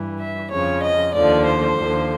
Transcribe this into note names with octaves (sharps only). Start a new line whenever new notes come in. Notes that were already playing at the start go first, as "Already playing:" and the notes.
Already playing: G2 E3
E5
F2 C#3 F3 C#5
D#5
D#2 D3 F3 D5
C5
D#2 D3 F3